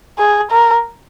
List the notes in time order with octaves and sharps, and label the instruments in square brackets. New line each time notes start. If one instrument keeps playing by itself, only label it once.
[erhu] G#4
A#4